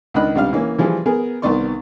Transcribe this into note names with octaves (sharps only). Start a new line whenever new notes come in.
C#2 D#3 D4 D#5 B5 F#6
C#2 C3 G3 D4 F5 F6
E3 A#3 C#4
E3 F3 G3 G#4
B3 G#4 A#4
C2 D#3 B3 D5 C6 C#6